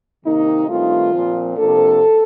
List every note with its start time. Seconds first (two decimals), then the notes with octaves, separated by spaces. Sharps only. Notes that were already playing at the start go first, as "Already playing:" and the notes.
0.25 C3 D#3 A#3 D#4
0.69 G2 D#3 A3 C4 F4
1.13 A#2 F3 C4
1.57 C3 F3 A#3 D4 A4